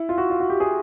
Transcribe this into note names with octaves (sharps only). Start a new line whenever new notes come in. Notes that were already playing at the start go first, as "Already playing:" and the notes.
Already playing: E4
F4
F#4
F4
F#4
G4
G#4